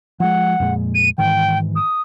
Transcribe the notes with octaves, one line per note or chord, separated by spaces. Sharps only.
F3 G#3 F#5
F2 A#2 G#3
D#7
G#2 D#3 E3 G5
D#6